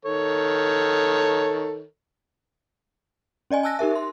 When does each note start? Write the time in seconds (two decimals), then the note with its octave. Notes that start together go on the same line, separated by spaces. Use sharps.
0.05 D#3 A4 C#5
3.51 C#4 D5 D#5 G#5
3.63 G#5 A5 E6 F#6 A#6
3.79 D#4 G4 A#4 E5
3.95 C6